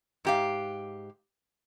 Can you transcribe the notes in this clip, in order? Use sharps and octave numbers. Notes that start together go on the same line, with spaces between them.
G#2 G4 F5